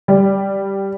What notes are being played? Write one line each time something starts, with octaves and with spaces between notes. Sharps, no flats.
G3